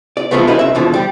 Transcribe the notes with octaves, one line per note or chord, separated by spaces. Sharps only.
D5
C2 A#2 E3 F3 A3 B3
A#3 C#4 D#4 E4 F#4 B4
C2 E5
E2 B2 D3 E3 F3
G3 G4